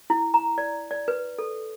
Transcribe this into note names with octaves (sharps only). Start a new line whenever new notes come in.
E4
A#5
D5
D5
B4
A4